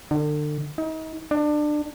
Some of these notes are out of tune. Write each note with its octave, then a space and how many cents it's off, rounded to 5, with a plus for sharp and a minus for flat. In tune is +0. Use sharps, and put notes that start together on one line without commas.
D3 +35
D#4 +35
D4 +25